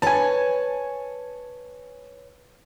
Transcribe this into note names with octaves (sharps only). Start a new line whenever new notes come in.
B4 C#5 G#5 A5